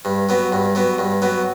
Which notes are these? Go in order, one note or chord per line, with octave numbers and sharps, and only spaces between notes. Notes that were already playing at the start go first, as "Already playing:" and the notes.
G2
F#3 B3
G2
F#3 B3
G2
F#3 B3